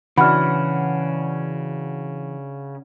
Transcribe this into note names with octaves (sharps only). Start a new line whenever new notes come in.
C#3 E3 D4 F#4 F#5 B5 F6